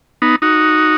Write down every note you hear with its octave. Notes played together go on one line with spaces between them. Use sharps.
B3 D#4
D#4 F#4